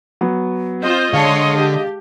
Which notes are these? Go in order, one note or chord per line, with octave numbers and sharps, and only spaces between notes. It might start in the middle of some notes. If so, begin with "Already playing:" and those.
F#3 B3
C4 F4 C5 D#5
D3 G#3 C#5 F5 A5 C6
G4